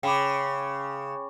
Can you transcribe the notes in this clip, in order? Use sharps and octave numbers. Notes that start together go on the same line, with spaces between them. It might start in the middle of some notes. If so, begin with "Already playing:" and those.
C#3 G5 B5 D6